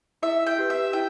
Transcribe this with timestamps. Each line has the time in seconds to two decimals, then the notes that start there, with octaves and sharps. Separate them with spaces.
0.22 E4 E5
0.46 G5
0.58 G4 B4
0.70 E5
0.93 E4 G5